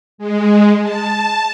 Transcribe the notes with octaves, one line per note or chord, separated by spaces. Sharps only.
G#3
A5